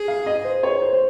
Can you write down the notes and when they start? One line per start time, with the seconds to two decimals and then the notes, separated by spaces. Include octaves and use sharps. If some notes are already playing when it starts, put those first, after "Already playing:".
Already playing: G#4
0.08 F5
0.26 D#5
0.44 C5
0.63 C#5
0.82 C5
0.93 C5